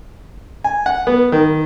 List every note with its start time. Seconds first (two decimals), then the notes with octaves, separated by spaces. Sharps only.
0.64 G#5
0.86 F#5
1.07 B3
1.32 D#3